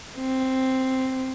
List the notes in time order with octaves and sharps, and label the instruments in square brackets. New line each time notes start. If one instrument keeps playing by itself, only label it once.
[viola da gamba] C4